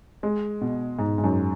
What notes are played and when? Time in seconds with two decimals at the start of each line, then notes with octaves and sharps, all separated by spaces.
0.23 G#3
0.61 B2
0.99 G#2
1.18 G#2
1.24 F#2